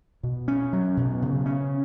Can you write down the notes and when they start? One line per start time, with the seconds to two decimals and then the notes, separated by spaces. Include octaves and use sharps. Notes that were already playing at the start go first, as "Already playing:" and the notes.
0.23 B2
0.48 C#4
0.73 F#3
0.97 B2
1.22 C#3
1.46 C#4